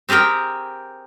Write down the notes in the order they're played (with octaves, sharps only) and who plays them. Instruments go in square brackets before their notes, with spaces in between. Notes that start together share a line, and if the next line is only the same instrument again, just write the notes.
[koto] C4 G4 G#4 A#4 G5